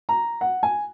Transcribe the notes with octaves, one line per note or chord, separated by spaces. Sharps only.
A#5
F#5
G#5